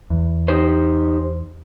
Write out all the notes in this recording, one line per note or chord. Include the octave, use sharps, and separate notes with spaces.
E2
D#4 G4 C5